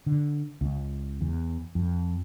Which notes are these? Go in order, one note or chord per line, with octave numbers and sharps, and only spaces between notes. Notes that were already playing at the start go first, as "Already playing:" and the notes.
D3
C#2
E2
F2